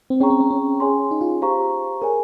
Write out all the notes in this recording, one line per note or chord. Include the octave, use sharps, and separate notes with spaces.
C4
C#4 G#4 C#5 G5 A#5 C#6
C4
C#4
C#4
G#4 C#5 G#5 C6
D#4
F4
G4 C5 F5 A#5 C#6
G#4 A#4 C#5 G#5